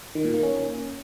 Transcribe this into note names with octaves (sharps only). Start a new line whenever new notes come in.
D#3
A#2
A#3
C#4